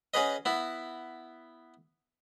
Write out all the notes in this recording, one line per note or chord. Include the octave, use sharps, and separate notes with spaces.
C#4 F#4 G#4 B4 D#5
B3 E4 F#4